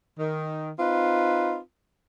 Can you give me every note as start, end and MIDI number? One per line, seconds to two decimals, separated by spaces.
0.18 0.69 51
0.79 1.58 60
0.79 1.58 63
0.79 1.58 65
0.79 1.58 71